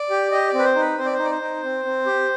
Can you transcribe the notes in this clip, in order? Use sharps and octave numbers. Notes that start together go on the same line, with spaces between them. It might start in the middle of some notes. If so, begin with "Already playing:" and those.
Already playing: D5
G4
G4 D#5
D5
C4
B4
C5
D#4
B4
C4 C5
D5
C5
D#4
D5
C5
D#4
C4
C4
G4